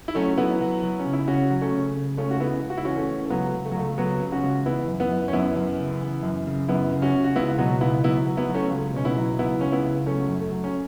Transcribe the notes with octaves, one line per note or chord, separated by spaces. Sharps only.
E4
F#3 A3 C#4
F#3 B3 E4
F#3
F#3
C#4
C#3
E4
C#3 C#4 F#4
F#3
A3 C#4
C#3
C#3
C#2 A3 C#4
F#4
C#3 B3 E4
C#2
F#4
E4
E3 C#4 F#4
A3 C#4
E3
A3
C#2 F#3 B3
C#2
A3
F#3
C#2 A3
C#2 F#3 B3
C#3
C#4 F#4
C#2
E3 B3 E4
F#2
B3 E4
F#2
C#4
F#2 B3 E4
F#2
C#3
E3
F#2
C#3
F#2 B3 E4
C#3
C#4 F#4
C#3
F#4
C#2 B3 E4
B2 F#3 B3
C#2 B3 E4
F#3 B3 E4
F#3
B3 E4
F#3
A3 C#4
C#2
B2 C#4
B3 E4
F#3
C#2 B3 E4
C#2 C#4
B3 E4
C#2
F#3 A3 C#4
F#2
A3
F#3
C#4